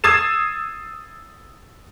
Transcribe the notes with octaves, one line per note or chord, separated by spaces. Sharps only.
D#6 E6 G#6 A6 C7 E7